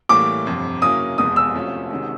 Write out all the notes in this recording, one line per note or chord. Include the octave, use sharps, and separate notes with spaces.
A2 E3 G3 A#3 D6
G1 F2 C3
C#3 F#3 A#3 C#4 E4 D#6
F1 E2 B2 G#3 D#6
E6
C3 F3 A3 C#4 F4
C3 D#3 G#3 C#4 F#4